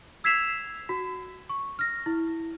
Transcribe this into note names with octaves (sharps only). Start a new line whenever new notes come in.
E6 G#6 B6 C7 E7 F7
F#4
C#6
F6 A#6
E4